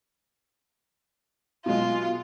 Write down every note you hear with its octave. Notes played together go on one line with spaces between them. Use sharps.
B2 F#3 G#3 F4